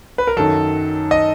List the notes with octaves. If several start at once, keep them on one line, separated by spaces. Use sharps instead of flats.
B4
A#4
F#2 D#3 F#3 A4
D#5